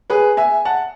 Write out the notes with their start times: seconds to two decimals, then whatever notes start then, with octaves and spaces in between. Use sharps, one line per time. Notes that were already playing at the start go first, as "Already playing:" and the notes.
0.10 G#4 B4
0.37 E5 G#5
0.65 F#5 A5